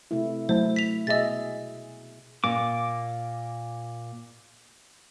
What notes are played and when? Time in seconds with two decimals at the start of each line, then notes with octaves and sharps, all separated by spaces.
0.11 C3 A3 E4
0.49 F#3 A3 E4 C5
0.76 B6 F7
1.07 B2 G#4 D#5 E5 A6
2.44 A#2 D6